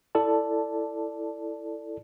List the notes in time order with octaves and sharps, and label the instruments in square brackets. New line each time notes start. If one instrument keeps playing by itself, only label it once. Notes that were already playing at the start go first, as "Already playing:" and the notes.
[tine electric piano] E4 A4 D5 A5